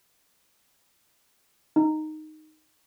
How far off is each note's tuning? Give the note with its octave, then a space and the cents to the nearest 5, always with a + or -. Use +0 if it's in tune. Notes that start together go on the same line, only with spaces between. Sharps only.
D#4 -5